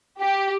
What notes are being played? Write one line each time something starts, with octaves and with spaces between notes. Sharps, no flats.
G4